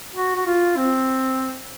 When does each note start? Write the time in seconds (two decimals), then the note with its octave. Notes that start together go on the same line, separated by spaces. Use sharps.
0.15 F#4
0.36 F#4
0.46 F4
0.76 C4